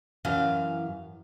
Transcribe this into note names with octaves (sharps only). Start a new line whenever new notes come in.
F#2 E3 F5